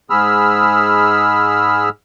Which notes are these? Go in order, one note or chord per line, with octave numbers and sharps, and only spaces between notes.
G#2 G#4 B5 E6 F6